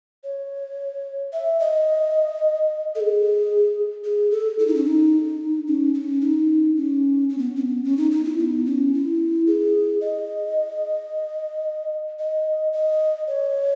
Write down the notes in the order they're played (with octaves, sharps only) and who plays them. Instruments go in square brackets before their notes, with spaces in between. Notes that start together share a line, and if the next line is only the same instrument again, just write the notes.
[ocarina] C#5
E5
D#5
A4
G#4
G#4
A4
E4
D#4
C#4
D#4
C#4
C#4
D#4
C#4
C#4
B3
C#4
B3
C#4
D#4
D#4
E4
B3
C#4
E4
G#4
D#5
D#5
D#5
C#5